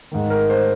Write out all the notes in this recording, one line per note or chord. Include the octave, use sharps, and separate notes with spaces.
G#2 D#3
A#4
C5